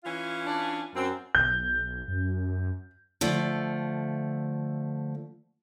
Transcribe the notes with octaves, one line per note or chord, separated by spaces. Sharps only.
E3 C#4 F4
D4
F#2 C4
B1 G6
F#2
D3 F3 A3